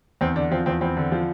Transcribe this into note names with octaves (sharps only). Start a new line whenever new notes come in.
E2 C4
D3 D4
F3 C4
E2 C4
E2 C4
D3
F3